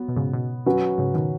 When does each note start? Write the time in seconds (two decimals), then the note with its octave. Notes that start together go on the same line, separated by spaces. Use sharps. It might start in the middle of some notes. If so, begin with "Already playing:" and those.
Already playing: F#3 B3
0.09 B2
0.16 G#2 C#3
0.34 B2
0.66 F#3 C#4 F#4 B4
0.98 G#2 C#3
1.14 B2 D#3